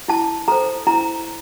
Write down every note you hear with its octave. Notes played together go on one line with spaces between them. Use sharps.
E4 A5
A4 C5 A#5
E4 A#5